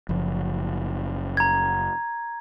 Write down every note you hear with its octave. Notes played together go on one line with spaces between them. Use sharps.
F#1 F3
A#5 G#6